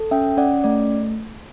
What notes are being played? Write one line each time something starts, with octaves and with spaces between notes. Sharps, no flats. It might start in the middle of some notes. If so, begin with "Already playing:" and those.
Already playing: A4
C#4 E5 G5
C#4 D5 F#5
A3 D5